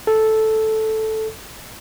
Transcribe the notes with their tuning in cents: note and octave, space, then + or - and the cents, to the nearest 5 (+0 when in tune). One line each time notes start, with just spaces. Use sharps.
A4 -5